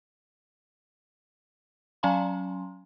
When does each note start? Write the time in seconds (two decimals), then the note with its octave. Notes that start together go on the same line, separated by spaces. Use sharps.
2.03 F#3 C#4 F5 G#5 A#5 C6